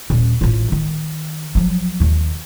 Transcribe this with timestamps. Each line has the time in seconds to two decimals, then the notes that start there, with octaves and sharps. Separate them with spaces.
0.10 D#1 C#4
0.41 A1 F4
0.72 D#3
1.55 F3 F#3
2.00 D#2 D#3